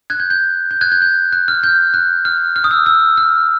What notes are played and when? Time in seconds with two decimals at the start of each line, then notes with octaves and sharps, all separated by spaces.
0.10 F#6 G#6
0.20 G6
0.30 G6
0.71 G6
0.81 F#6 G#6
0.92 G6
1.02 G6
1.33 F#6
1.48 F6
1.63 G6
1.94 F#6
2.25 F6
2.56 F6
2.64 D#6
2.71 E6
2.86 E6
3.17 F6